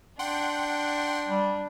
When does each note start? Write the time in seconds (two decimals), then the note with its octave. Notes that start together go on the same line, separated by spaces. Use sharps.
0.19 D4 F#5 G5 C6
1.29 G3